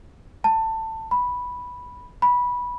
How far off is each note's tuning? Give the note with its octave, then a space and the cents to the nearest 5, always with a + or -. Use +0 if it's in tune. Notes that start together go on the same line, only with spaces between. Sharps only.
A5 +20
B5 -5
B5 -15